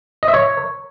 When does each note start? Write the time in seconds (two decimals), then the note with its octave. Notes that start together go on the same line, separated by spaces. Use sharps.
0.23 D#5
0.28 E5
0.34 C#5